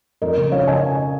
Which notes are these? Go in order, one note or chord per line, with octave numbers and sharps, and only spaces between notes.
F2 A#4 D#5
C#3
F3 C#5 F5
C#3 D#5 G#5